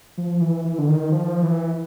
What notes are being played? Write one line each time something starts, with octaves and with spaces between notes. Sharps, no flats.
F3
E3
E3
D3
D#3
F3
E3